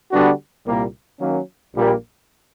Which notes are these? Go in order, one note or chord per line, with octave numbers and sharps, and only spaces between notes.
D3 G3 B3 D4 F#4
C2 A#2 G3 A#3
D#3 F#3 A#3 C#4
A#1 A#2 G3 A#3